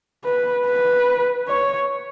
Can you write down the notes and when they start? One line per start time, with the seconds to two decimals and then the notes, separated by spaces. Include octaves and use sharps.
0.25 B4
0.66 B4
1.48 C#5